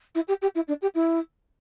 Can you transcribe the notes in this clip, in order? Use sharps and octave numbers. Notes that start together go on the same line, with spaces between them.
E4
G4
G4
E4
D4
G4
E4